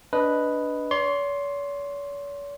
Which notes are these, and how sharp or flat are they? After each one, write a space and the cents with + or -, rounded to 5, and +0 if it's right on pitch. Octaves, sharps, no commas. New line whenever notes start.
D4 -10 B4 +0 D#5 +5
C#5 +45 C6 +10